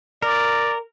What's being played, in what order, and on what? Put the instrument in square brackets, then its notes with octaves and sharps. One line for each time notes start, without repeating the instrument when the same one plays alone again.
[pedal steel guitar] A#4 [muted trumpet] D5